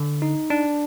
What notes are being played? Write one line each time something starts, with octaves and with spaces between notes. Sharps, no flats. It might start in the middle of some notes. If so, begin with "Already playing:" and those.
Already playing: D3
D#4
D4